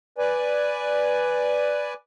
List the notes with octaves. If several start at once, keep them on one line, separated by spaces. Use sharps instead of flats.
B4 D5 G#5